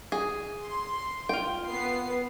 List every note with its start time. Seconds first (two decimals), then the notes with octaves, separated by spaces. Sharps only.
0.12 G#4
0.62 C6
1.29 F4 G5
1.67 B3 C7